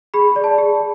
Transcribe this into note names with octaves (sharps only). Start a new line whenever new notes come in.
G#4 B5
D5
A5
G#4